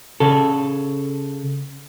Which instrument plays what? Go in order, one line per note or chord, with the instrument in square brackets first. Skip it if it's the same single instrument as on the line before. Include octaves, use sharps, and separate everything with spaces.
[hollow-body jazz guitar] C#3 A4